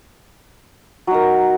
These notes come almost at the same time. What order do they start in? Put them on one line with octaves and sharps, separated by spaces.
F#3 D#4 A#4